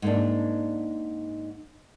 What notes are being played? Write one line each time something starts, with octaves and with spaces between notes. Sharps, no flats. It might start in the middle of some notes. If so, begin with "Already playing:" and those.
G#2 A#3 D4